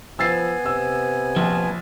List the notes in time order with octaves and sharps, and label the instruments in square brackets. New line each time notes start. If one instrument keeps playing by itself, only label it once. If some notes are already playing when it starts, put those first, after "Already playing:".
[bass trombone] F3 [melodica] B3 G#5 [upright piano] E6 A6 C7
[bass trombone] C3 [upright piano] E6
[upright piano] A#1 [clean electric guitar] F3